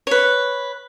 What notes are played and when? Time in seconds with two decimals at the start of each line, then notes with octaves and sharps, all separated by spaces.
0.07 B4 C#5